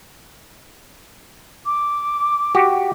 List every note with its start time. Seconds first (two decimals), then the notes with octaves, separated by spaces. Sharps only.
1.66 D6
2.55 F#4 G4